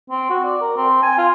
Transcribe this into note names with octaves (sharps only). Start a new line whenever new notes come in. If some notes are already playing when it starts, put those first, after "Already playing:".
C4
F#4
D5
A#4
C4
G#5
F4